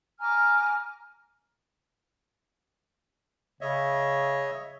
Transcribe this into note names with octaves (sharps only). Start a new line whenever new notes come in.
G#5 A#5 D6 F6
C#3 C#5 D#5 E5